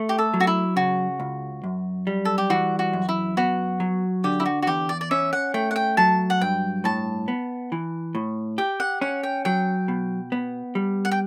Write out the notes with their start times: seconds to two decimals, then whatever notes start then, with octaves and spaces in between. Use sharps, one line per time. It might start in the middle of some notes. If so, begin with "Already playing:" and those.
Already playing: A3
0.09 G4
0.18 A4
0.34 F#3
0.40 F#4
0.47 E4
0.76 C#3 F#4
1.20 C#2
1.64 F#2
2.07 G3
2.25 A4
2.38 G4
2.50 E3 F#4
2.79 F#4
2.93 F#2
3.09 E4
3.37 B3 F#4
3.80 F#3
4.24 D3 G4
4.40 E4
4.46 F#4
4.62 F#4
4.67 E2 G4
4.89 D5
5.01 D5
5.11 C#4 E5
5.33 F#5
5.54 A3 G5
5.71 F#5
5.76 G5
5.97 F#3 A5
6.30 F#5
6.41 G2 G5
6.84 A2 A5
7.28 B3
7.72 E3
8.15 A2
8.58 G4 G5
8.80 F#5
9.01 C#4 F#5
9.23 G5
9.45 F#3 G5
9.88 B2
10.32 B3
10.75 G3
11.05 F#5
11.11 G5